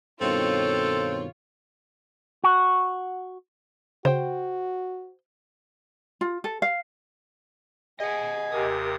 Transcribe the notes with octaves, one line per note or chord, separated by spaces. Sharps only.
G2 B2 D#3 C4 F4 A4 C#5
F#4
C#3 F#4 C5 G5
F4
A4
F5
G#4 D#5 F#5 G#5
D#2 C3 G4 A#4 D#6